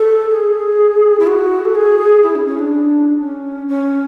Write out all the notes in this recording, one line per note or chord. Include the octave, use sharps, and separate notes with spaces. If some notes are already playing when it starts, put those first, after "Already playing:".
Already playing: A4
G#4
E4
F#4
A4
G#4
E4
C#4
C#4
D4
C#4
C#4